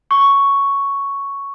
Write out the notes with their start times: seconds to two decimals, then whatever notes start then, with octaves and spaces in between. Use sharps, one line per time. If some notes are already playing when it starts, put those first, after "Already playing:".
0.11 C#6